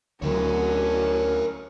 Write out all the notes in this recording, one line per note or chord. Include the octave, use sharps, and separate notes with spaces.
D2 F#3 C#4 A#4 C#5